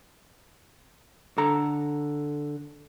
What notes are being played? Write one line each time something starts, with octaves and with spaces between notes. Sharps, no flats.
D3 A4 A#5